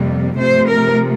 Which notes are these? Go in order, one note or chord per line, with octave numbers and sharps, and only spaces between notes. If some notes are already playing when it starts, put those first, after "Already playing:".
Already playing: F2 C3 G3 A#3
C3 F3 A3 C5
A#4